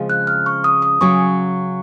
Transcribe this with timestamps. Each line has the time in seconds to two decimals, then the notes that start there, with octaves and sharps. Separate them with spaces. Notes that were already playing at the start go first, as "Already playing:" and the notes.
Already playing: C#3 F3 G#3 C4 F4
0.10 F#6
0.27 F6
0.46 C#6
0.64 D#6
0.82 D#6
1.01 C#3 F#3 C#4 C#6